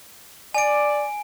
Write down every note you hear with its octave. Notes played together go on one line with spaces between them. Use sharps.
D5 G#5 D7